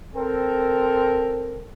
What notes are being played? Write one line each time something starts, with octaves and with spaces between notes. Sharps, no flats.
C4 A4 A#4